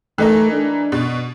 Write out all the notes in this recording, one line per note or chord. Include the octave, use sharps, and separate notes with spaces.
E3 A3 D#4 A#4
D4
B2